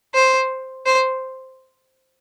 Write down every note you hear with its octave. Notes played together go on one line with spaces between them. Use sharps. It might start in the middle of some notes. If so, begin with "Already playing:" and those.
C5
C5